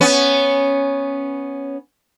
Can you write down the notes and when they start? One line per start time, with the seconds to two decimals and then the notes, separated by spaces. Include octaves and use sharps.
0.01 B3 C#4